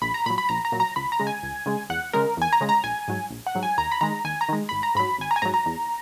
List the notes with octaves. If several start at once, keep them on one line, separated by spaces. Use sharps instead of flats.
A#1 B5
A#5
A#2 F#3 B5
B5
A#1 A#5
A#5
A#2 F#3
A#5
C#2 B5
A#5
C#3 G#3
G#5
C#2
C#3 G#3
E2 F#5
C#3 G#3 A#4
E2 G#5
A#5
C#3 G#3
A#5
A#1 G#5
G#2 F#3
A#1
F#5
G#2 F#3
G#5
D#2 A#5
B5
D#3 G#3 A#5
D#2 G#5
A#5
D#3 G#3
G#1 B5
A#5
G#2 F#3 B5
G#1 G#5
A#5
G#5
G#2 F#3 A#5
A#5
E2